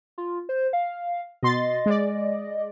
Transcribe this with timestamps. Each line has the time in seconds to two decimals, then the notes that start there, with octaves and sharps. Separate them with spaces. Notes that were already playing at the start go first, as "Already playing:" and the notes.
0.18 F4
0.49 C5
0.73 F5
1.43 B2 D#5 C6 A6
1.86 G#3 D5